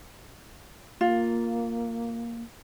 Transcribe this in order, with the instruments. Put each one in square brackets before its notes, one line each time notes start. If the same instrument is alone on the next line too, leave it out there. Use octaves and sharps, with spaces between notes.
[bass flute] A#3 [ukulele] F4